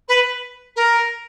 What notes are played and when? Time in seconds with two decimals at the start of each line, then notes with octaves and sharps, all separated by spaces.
0.08 B4
0.76 A#4